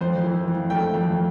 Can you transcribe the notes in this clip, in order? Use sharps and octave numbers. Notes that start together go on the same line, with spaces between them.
F2 C5
E3
F2
A3 G5
F2